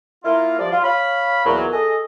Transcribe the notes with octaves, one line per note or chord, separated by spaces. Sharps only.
A#3 E4 F4
F3 G3 D5
F4
C#5 F5 B5
E2 A#2 F#3
G#4 A4 D#5